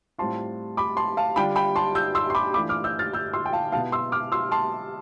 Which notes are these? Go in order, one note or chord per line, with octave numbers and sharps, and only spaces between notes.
A2 G3 C4 F4 A5 C6
B5 D6
A5 C6
F5 A5
D3 G3 D4 F4 G5 B5
G5 B5
A5 C6
E6 G6
C6 E6
C6
B5 D6
E3 A3 D4 F4 B5 D6
D6 F6
E6 G6
F6 A6
E6 G6
C6 E6
G5
F5 A5
B2 B3 E4 F5 A5
C6 E6
D6 F6
C6 E6
A5 C6